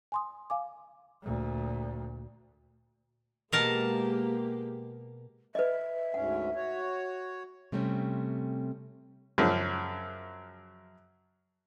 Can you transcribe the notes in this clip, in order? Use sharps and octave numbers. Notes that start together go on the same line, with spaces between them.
G#5 C6 D#6
F5 G#5 D6
D2 A#2
B2 G#3 A#3 G4 A#4 A5
B4 D#5 E5
D2 G#2 C#4 F#5
F#4 C#5
C3 G3 A3 C4 C#4
F#2 C#3 F3 F#3